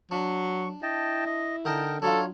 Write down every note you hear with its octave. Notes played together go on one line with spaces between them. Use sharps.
F#3 D4 C#6
E4 D#5 G5 A5
D#5
D3 D#4 A#4 D#5 G5 A5
F#3 D4 D#4 F4 A4 C#5